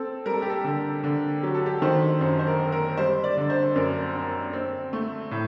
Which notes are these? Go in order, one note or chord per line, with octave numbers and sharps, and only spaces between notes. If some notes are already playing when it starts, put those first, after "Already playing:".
Already playing: C4 A4
G3 A#4
A4
G4
A4
D3 A4
D3
F#3 G4
A4
G4
D#3 C5
F#2 C5
C5
A#4
C4
A#4
G3 C5
D5
D3
C5
F#2 A#4
C4
C4
A3
A2